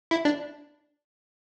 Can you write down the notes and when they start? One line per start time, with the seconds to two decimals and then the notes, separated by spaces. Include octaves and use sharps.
0.11 E4
0.25 D4